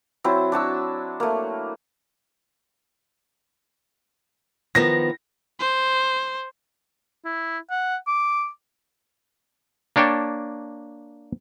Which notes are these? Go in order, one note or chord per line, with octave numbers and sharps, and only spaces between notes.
F#3 C4 E4 A5
D4 F#4 A5 E6
A3 A#3
D#3 F3 B3 A#6
C5
E4
F#5
D6
A#3 D4 C#5 G5 A5